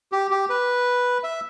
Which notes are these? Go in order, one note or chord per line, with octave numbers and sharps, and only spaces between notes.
G4
G4
B4
E5